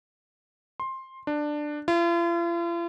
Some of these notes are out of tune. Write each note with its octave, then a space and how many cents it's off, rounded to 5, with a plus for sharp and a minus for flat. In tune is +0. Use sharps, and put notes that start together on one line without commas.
C6 +15
D4 +15
F4 -45